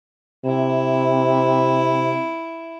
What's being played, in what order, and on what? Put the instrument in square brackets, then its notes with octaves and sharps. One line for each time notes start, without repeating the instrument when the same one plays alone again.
[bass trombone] C3 [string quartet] E4